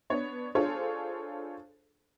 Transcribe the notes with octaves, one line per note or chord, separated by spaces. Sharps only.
B3 D4 C#5
D4 F4 G#4 A4 C5 C#5